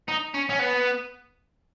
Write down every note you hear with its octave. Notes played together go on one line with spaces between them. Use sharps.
D#4
C#4
C#4
B3